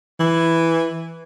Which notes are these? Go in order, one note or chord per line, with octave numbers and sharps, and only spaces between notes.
E3